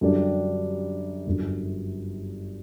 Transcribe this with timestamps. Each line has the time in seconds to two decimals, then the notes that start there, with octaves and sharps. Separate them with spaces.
0.01 F#2 D3 G3 D4 G4
1.27 G1 F#2 D3